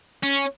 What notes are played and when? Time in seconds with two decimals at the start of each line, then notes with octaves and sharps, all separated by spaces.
0.23 C#4